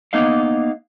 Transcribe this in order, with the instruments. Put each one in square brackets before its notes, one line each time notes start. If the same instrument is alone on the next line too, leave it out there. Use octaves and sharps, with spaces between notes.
[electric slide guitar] A#3 B3 D#4 D#5 F5